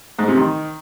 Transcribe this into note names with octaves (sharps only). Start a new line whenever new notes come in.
G#2
C3
D#3